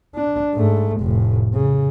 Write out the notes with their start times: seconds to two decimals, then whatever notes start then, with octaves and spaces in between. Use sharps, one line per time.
0.15 D4
0.55 G#2 A3
1.01 F1 A2
1.54 C#3